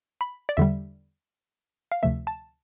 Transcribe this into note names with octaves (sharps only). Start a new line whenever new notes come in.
B5
D5
E2 D3 G3 E5
F5
D2 C3 F3 A3 E5
A5